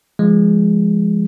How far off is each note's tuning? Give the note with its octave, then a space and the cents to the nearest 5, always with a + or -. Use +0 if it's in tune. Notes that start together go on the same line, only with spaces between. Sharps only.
F3 -25 G#3 -5